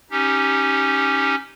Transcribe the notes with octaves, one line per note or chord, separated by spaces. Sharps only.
C#4 D#4 G4